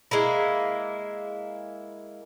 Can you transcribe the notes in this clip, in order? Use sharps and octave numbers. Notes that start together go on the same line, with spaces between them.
G#3 A#3 E4